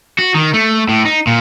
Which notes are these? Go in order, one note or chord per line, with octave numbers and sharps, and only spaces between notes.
F#4
D#3
A3
A2
D#4
A#2